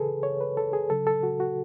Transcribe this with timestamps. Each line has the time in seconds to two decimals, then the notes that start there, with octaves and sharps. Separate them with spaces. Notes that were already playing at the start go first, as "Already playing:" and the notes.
Already playing: C#3 E3 G#4 A4 B4
0.23 C#5
0.41 B4
0.57 A4
0.73 G#4
0.90 C#3 F#3 A4
1.07 A4
1.23 F#4
1.40 F#4